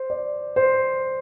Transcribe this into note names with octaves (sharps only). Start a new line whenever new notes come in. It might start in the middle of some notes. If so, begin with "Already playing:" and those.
Already playing: C5
D5
C5